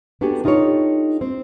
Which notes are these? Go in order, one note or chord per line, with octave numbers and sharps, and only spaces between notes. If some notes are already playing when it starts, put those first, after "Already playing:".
B3 D4 F#4 G4 A4 G#5
D4 D#4 F4 G4 A4 C#5
C4